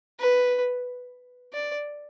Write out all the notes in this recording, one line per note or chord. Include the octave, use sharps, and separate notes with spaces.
B4
D5